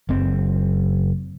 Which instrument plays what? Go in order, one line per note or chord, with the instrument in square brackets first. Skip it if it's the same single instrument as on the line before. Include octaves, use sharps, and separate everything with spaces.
[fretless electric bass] F#1 C4